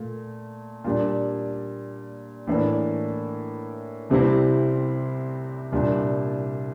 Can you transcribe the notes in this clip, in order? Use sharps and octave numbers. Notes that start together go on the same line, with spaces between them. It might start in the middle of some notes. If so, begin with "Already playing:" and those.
Already playing: A#2 A3
A#2 G3 D4
A2 E3 A#3 D4
C2 C3 G3 C4 E4
C2 A#2 G3 D4